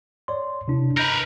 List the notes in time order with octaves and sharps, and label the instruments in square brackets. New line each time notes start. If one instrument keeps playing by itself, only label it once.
[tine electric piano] C#5 D5 C6
C3 D4 E4
[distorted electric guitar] A#4 B4 [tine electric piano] D#5 G6 A#6